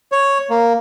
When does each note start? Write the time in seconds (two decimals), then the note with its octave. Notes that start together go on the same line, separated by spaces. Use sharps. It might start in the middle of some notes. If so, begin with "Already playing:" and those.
0.12 C#5
0.50 A#3